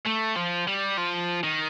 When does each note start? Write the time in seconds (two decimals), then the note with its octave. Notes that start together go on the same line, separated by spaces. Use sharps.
0.06 A3
0.36 F3
0.67 G3
0.98 F3
1.43 D#3